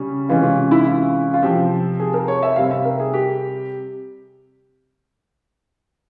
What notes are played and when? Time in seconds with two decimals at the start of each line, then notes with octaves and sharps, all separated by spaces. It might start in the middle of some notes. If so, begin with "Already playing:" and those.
Already playing: C#3 G3 C#4
0.29 C3 E3 G#3 C#4 F4
0.43 F4
0.71 E4
0.86 F4
1.34 F4
1.42 C3 F3 C4 G4
2.00 G#4
2.14 A#4
2.28 C#5
2.43 E5
2.56 C3 G3 C4 F5
2.71 E5
2.85 A#4
3.00 G#4
3.14 G4